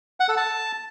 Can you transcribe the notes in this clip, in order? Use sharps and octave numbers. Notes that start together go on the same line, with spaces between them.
F#5
A4
A5